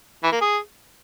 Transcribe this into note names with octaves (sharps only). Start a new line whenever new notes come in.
E3
A#3
G#4